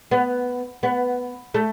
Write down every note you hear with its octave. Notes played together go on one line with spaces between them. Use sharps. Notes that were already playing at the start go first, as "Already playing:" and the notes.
B3
B3
A3